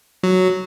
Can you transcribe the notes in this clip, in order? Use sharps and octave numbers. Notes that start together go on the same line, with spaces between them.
F#3